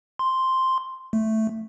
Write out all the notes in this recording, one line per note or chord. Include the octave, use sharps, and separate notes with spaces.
C6
A3